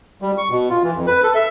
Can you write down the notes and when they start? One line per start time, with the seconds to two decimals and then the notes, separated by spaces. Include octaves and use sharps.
0.22 G3
0.38 C#6
0.51 B2
0.70 F4
0.83 E3
0.95 F2
1.07 B4
1.23 A4
1.35 E5